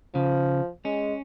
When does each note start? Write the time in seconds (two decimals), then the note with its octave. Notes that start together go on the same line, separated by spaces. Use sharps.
0.15 C#3 F3
0.85 G#3 C#4